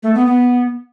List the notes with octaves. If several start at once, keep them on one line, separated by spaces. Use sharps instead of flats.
A3
B3
B3